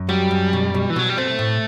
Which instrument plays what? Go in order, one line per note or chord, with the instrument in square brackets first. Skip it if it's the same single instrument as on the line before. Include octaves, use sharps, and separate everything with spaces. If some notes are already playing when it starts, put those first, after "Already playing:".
Already playing: [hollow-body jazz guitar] F#2
[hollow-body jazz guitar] F#3 [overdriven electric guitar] G3
[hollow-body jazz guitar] F#2
B2
B2
[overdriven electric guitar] E3
[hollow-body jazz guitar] B2 [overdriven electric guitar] F#3
[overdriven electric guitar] G3
[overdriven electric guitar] A3 [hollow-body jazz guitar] C4
[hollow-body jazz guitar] A2